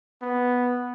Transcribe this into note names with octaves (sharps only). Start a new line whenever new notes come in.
B3